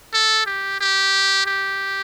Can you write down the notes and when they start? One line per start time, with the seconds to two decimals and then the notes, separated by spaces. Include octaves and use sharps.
0.14 A4
0.46 G4
0.81 G4
1.47 G4